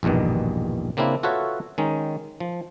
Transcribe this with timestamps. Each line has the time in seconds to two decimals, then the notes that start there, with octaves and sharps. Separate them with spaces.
0.03 A#1 E2 G2 B2 D#3
0.97 C#3 A#3 C4 D4 E4
1.23 F4 F#4 A4 B4 C#5 E5
1.78 D#3 G#3 C#4 D#4
2.40 F3